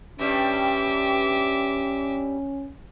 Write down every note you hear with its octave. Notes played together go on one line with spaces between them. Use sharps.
G2 G3 C#4 E5 D6